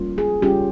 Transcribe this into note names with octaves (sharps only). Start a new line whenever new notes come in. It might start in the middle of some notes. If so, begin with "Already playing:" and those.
Already playing: G3 A#3 C#4 F4
G#4
G3 C#4 F4 G4